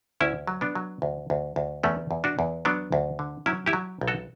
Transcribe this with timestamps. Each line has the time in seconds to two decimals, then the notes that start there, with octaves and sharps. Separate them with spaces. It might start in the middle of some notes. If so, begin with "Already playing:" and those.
0.21 D2 C#4 E4
0.47 F#3
0.61 B3 D4
0.75 F#3
1.02 D2
1.30 D2
1.56 D2
1.83 E2 A3 C#4
2.11 E2
2.24 D4 F#4
2.39 E2
2.65 F#3 B3 D4
2.92 D2
3.19 D3
3.46 F#3 C#4 E4
3.66 E4 G4
3.73 F#3
4.01 B1
4.08 F#4 A4